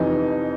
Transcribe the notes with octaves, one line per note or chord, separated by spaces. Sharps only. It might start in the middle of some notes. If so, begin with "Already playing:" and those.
Already playing: F2 C3 E3 D#4